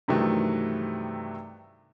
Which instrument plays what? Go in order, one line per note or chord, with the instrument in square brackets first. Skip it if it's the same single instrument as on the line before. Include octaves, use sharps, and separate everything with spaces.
[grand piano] G2 C3 D#3 E3 F#3 A3